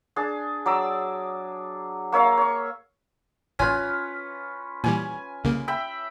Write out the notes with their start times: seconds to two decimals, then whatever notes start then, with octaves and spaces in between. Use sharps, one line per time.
0.16 D4 G#4 A5
0.66 F#3 D5 D6 E6
2.12 A#3 C#5 E5 F5
2.38 C#5 C#6
3.59 A1 C#4 F4 B4 G#5
4.84 A#2 E3 G3 G#5
5.44 C2 C#3 A#3
5.68 E5 G5 B5